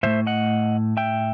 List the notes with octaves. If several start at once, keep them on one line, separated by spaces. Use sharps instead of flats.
A2 E3 A3 C5 E5
D#5 F#5
E5 G5